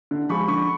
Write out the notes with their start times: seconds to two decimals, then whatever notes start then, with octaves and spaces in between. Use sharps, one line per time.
0.11 D3
0.29 F3 G#3 B5 C#6
0.48 D3 B5 C#6